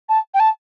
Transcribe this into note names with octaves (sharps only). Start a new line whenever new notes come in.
A5
G5
A5